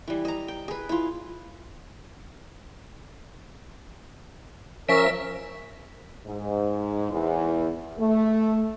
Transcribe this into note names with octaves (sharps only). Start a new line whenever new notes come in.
E3 G3
D#5 A#5
G5
G#4 B4
E4 F4
F3 C#4 A#4 E5 E6 A#6 B6 D7
G#2
E2
A3